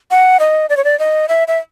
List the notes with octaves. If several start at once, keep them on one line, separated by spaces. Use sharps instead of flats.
F#5
D#5
D5
C#5
D5
D#5
E5
E5